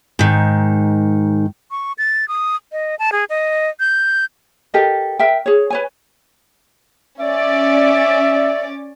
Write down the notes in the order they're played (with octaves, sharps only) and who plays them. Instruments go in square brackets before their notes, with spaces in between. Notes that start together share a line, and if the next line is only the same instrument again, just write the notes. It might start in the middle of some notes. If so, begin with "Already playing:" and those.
[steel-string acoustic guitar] G#2 D#3
[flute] C#6
A6
D#6
D#5
A5
G#4
D#5
G6
[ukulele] G4 A4 A#4 D#5
A#4 E5 G5
G#4 C#5
B4 C#5 G#5
[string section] C#4 D5 [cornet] E5